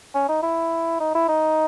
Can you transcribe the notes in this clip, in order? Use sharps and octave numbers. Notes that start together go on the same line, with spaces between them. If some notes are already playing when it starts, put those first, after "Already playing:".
C#4
D#4
E4
D#4
E4
D#4